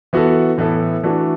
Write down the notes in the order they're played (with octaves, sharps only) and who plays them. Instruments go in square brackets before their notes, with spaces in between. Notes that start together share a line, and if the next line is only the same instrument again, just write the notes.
[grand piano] E3 B3 F#4 A4
A2 E3 B3 E4 A4
E3 A3 D4 F#4 A4